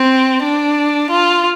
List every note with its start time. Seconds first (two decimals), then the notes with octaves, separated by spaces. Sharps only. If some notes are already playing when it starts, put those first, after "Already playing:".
Already playing: C4
0.43 D4
1.10 F4